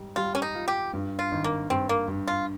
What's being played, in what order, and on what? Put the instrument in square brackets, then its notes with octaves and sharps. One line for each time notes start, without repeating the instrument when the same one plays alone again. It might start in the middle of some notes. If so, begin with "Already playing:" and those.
Already playing: [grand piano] G#2 G3
[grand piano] G3 [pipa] F4
[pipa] C#4
D#4
[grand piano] F4
[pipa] G4
[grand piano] G2
[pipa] F4
[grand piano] G#1
[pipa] A#3
[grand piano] G2 [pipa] C4
[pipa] A#3
[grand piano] G2
[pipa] F4